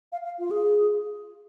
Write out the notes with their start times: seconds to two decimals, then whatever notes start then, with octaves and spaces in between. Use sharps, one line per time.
0.12 F5
0.24 F5
0.39 F4
0.51 G#4